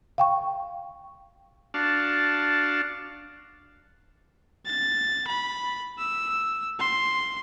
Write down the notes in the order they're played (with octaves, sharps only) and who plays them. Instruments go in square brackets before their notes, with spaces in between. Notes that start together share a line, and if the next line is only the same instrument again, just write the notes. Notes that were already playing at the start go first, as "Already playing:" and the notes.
[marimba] F5 G5 C#6
[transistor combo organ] D4 F#4 F5 A5
[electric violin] A6
B5
E6
C6